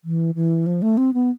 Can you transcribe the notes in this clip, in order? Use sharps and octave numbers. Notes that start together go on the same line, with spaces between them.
E3
E3
F3
A3
C4
B3